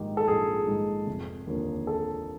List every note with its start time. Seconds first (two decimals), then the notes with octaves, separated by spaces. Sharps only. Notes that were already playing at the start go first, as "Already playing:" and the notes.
Already playing: A#1 G#2 D#3 G4
0.17 A4
0.28 A#1 G#4
0.67 G#2 D#3
1.07 F1
1.47 D#2 D3 F3 A#3
1.87 A4